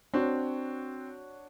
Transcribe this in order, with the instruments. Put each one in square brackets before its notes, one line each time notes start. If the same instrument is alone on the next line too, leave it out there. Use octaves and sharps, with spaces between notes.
[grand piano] C4 [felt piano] D4 F#4 C#5